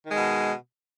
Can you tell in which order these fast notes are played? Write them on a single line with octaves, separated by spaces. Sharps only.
D#3 G#3 B2